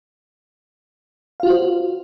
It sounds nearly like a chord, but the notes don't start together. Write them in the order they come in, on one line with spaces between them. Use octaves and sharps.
F5 F4 F#4 C5